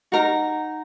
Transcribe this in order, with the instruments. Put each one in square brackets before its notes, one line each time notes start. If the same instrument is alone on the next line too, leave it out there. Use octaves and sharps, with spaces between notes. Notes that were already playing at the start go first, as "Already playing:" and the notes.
[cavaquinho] D#4 F#4 A#4 A#5